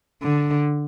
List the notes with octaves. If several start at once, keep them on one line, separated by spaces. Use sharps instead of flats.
D3